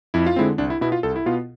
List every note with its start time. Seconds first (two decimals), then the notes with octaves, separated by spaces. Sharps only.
0.14 F2 E4
0.27 F4
0.36 D3 G#3 C4 E4
0.58 C2 D4
0.70 E4
0.81 B2 B3 E4
0.92 F4
1.03 C2 A4
1.16 E4
1.26 B2 B3 F4